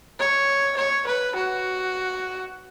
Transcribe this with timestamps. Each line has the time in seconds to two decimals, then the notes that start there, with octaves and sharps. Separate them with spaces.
0.20 C#5
0.77 C#5
1.07 B4
1.36 F#4